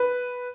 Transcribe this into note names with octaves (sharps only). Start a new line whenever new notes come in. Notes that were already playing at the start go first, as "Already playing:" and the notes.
Already playing: B4